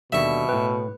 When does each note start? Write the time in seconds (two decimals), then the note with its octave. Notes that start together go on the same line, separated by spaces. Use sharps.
0.12 D#2 B2 D3 G3 E5 C#6
0.49 A2 B4 G5